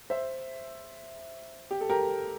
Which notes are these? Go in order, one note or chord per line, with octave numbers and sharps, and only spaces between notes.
C5 E5
G4
A4
G4 A#4